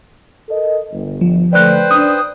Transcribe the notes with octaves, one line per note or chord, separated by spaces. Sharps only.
A4 A#4 D#5
G1
F3
D3 A3 B4 C5 D5 G5 F#6
D4 D#6